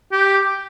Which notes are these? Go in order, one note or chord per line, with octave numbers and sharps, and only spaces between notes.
G4